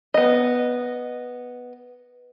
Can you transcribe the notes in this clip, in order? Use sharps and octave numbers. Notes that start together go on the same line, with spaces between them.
B3 D#5